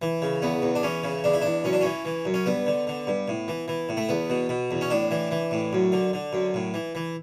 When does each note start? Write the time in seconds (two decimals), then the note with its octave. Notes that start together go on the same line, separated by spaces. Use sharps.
0.02 E3
0.22 C#3
0.42 E2 B3
0.62 E2
0.75 D4
0.83 E3 C#4
1.04 C#3
1.24 E2 D4
1.34 E4
1.42 E2 D4
1.64 F#2 C#4
1.73 D4
1.81 E3 C#4
2.05 E3
2.25 F#2
2.34 C#4
2.46 G2 B3
2.66 D3
2.87 D3
3.07 G2
3.28 A2
3.48 E3
3.68 E3
3.89 A2
3.97 A3
4.09 E2 B3
4.30 B2
4.49 B2
4.71 E2
4.81 C#4
4.90 A2 D4
5.11 E3
5.31 E3
5.51 A2
5.73 F#2
5.92 D3
6.13 D3
6.33 F#2
6.54 A2
6.74 E3
6.95 E3